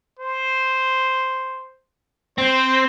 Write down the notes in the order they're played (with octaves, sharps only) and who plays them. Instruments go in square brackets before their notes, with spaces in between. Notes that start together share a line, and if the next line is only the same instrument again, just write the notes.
[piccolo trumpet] C5
[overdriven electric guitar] C4 [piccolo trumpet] C5